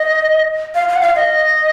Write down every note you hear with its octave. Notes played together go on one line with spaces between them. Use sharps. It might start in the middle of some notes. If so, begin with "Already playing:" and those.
Already playing: D#5
F5
F5
F#5
F5
D#5